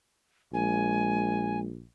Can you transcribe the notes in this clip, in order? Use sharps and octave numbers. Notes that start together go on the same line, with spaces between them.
A#1 G#3 G#5